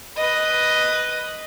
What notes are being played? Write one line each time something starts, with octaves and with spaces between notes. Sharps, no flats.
B4 D#5